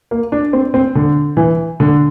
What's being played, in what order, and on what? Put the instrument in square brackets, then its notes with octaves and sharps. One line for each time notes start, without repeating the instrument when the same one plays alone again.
[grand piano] A#3
D4
C4
C4
D3
E3
D3